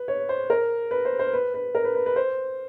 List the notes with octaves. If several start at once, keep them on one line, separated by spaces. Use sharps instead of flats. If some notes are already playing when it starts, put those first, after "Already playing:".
Already playing: B4
C#5
C5
A#4
B4
C5
C5
B4
B4
A#4
B4
B4
B4
C5